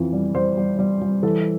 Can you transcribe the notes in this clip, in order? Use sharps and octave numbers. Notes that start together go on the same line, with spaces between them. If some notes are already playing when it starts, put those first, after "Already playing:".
Already playing: F2 E3
G3
G3 C5
G3
G3
G3
E3 A4